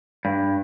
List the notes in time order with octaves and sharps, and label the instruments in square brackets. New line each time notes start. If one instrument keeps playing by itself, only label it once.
[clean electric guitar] G2